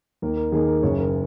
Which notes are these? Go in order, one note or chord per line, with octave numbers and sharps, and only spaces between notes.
D#2 D#3 A#3 D#4 A#4
A#4
D#2 D#3 A#3 D#4 G#4
A#4
F#1 F#2 C#3 C#5
A#4